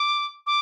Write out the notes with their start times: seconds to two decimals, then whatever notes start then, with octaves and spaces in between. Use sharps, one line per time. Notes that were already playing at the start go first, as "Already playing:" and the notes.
Already playing: D6
0.47 D6